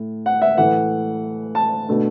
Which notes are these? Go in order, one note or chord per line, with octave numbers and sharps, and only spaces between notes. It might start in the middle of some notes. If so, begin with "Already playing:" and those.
Already playing: A2
F#5
E5
A2 E3 A3 F#5
A5
B2 A3 D4